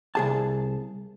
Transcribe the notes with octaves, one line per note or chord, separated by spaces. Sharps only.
C2 G#4 A5